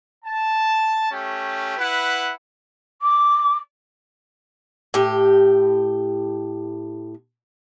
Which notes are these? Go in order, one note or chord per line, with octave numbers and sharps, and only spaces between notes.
A5
A3 C#4 G4
E4 B4 F#5
D6
A2 G4